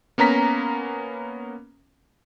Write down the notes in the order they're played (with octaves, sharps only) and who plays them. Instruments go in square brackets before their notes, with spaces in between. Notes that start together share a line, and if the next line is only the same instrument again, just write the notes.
[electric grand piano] A#3 B3 C#4 A#5 B6